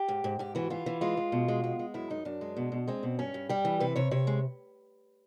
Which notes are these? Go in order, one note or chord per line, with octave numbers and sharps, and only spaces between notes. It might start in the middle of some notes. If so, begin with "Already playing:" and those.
Already playing: G4
G#2
G#2
G#2 G4
E3 F#4
E3 F4
E3
G#3 F4
G#3
B2
G#3
G#3
G#3
F#2 E4
F#2 D#4
F#2 D4
G#3
B2
B2
G#3 C4
B2
G2 C#4
G2
G3 G4
E3
C3 B4
C3 C#5
C3 C#5
G#3